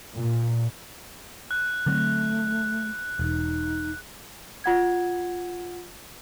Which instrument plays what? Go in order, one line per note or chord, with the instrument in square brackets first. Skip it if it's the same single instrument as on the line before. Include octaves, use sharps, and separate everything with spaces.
[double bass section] A#2
[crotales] F#6
[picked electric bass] D3 F#3 C4 [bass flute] A3
[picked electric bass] E1 [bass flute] D#4
[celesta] F4 F#5 G#6